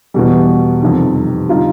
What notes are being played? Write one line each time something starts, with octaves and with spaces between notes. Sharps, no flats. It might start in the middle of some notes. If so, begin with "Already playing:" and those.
E2 B2 G3
F2 C3 D#3 G3
D3 G3 D#4 F4